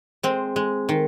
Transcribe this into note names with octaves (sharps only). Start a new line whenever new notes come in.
G#3 C4
G#3
D#3